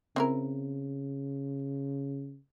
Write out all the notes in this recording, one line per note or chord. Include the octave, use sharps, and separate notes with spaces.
C#3 C4 E4 A#4